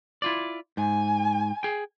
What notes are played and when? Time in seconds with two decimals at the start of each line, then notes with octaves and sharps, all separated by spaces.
0.22 E4 F4 D5
0.77 G#2 G#5
1.63 G#4 G5